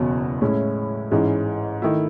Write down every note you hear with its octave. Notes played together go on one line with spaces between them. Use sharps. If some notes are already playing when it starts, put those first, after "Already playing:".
Already playing: F#1 E2 B2 F#3
A2 G#3 C#4 E4
A1 G#2 E3 G#3 C#4
D#3 A3 E4